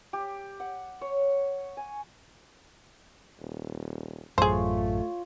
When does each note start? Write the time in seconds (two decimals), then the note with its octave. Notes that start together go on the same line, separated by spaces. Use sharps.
0.13 G4
0.60 F#5
1.01 C#5
1.77 G#5
3.40 D#1
4.38 A1 F#2 A3 F4 G#4 C5 C#5